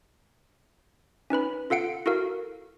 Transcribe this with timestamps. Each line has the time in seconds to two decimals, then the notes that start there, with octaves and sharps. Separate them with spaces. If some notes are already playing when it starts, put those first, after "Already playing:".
1.30 C#4 D#4 B4 B5
1.70 F4 A4 F5 F#5 D7
2.06 E4 F#4 A4 A#4 F5